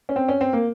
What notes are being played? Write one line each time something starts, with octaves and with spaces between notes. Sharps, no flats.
C#4
C4
C#4
C4
A#3